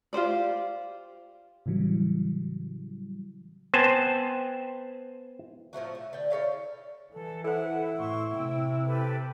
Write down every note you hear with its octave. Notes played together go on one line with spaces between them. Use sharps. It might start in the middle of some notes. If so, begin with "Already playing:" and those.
F4 G4 C5 D5
A2 C#3 E3 F#3 G3
B3 C4 C5 G#5 A5
A2 F3 A3 F#4
A3
D3 G5
E4 A4 C#5 F5
E3 A4
E4 A4 B4 C5 F#5
A2 C6 C#6
C3 C4 G5
G4 A4 B4